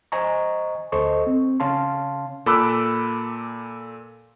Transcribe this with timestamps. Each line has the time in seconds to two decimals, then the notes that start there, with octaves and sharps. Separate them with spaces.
0.12 C5 D#5 G#5 A#5 C#6
0.92 D2 A4 C5 D#5 C#6
1.27 C4
1.60 C#3 C#4 F5 A5 C6
2.46 A#2 A4 B5 D6 E6 F#6